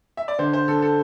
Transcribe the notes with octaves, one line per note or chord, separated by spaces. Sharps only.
E5
D5
D3 C5
C5
D3 A4
A4